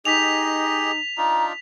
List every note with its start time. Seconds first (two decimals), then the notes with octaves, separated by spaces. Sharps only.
0.05 D#4 G4 G#4 D#5 B6 F7
1.18 D4 D#4 F4 A#5